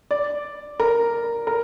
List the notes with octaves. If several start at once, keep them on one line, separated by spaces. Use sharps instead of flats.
D5
A#4
A#4